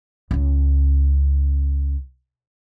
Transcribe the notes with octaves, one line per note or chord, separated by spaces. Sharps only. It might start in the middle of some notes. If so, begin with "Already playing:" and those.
C#2 C#4